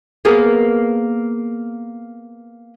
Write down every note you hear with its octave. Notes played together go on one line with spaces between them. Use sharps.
A#3 B3 G#4